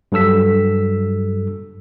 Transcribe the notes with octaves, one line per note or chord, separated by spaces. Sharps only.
G2 F#3 A4 E6 B6